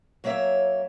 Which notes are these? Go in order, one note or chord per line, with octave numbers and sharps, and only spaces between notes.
F#3 A#3 C4 C#5 E5